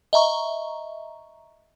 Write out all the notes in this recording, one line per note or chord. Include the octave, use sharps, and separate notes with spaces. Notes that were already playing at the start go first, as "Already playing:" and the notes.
D#5 E5 A#5 C#6